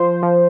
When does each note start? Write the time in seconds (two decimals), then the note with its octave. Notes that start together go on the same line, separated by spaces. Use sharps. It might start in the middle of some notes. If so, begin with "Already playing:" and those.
Already playing: F3 C5
0.23 F3